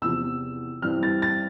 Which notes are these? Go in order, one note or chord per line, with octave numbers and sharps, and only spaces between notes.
E2 C3 F3 E6
G2 E3 G3 C4 E4 F6
A6
A6